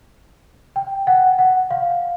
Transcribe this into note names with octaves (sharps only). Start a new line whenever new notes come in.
G5
F#5
F#5
F5